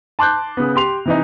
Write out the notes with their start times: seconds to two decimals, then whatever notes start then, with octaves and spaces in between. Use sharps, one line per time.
0.19 A5 C6 D6 F#6 G6
0.57 C#3 B3
0.76 G4 C6 F7
1.05 C3 E3 D#4